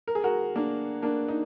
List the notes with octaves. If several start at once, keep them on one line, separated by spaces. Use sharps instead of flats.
A#4
G#4
F#4 A#4
A#3 D4
A#3 D4
D#4